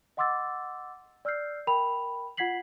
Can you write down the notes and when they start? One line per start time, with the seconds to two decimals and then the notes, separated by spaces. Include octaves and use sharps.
0.17 D#5 F#5 C6 D6 E6 A6
1.25 D5 E6 F6 G6 C7
1.67 A#4 G5 B5 F7
2.37 F4 F#5 G#6 B6 C7 F#7